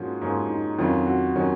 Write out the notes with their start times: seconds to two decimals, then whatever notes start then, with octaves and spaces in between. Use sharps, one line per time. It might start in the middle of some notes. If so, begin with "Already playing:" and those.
Already playing: G#2 F3 A#3 C#4 F4 F#4
0.21 G#2 F3 A#3 C#4
0.49 D#4
0.78 F2 D#3 F#3 C#4 F4
1.06 F#4
1.36 D#3 F#3 C#4